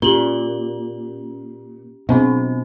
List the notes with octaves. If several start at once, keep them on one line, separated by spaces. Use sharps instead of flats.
A#2 C#4 G4 F#7 G7
B2 F#3 B3 C4 D4